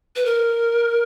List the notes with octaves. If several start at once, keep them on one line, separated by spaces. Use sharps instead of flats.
B4
A#4